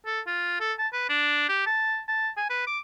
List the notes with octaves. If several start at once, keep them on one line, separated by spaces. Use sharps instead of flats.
A4
F4
A4
A5
B4
D4
G4
A5
A5
G#5
B4
D6